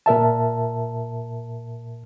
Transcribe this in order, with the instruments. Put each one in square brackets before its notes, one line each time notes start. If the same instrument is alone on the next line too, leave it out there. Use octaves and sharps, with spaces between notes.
[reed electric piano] A#2 A#4 E5 A5